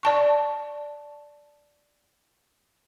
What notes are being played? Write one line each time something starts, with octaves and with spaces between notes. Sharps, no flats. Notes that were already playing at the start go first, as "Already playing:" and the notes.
D5 A5 C#6